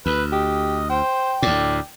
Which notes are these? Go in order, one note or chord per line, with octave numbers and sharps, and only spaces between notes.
D2 B4
G4 D#5
C5 G5
D2 A2 D5